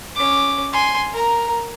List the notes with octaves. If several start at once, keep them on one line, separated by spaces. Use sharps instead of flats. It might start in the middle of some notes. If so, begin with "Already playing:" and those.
C#4 D6
G#5 C6
A#4 A#5